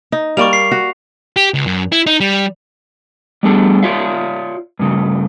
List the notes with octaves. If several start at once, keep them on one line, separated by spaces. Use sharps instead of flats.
D#4
G3 A#3 D5 C#6 F7
C7
F#4
G4
C#2
F#2
E4
D#4
G3
G3 A3 B3 D4 G#4 A4
F4 C#5 D5 E5 F5
G2 C#3 A3